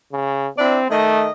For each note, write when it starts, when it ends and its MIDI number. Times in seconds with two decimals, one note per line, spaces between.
0.13 0.48 49
0.59 0.85 60
0.59 0.78 62
0.59 0.78 64
0.59 0.78 74
0.90 1.30 51
0.90 1.28 57
0.90 1.30 75